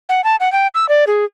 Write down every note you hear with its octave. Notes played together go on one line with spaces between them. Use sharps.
F#5
A5
F#5
G5
E6
D5
G#4